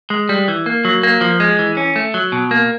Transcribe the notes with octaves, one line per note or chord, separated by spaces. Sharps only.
G#3
G3
E3
A#3
F#3
A#3
F3
G#3
E3
C#4
A3
F#3
B2
A#3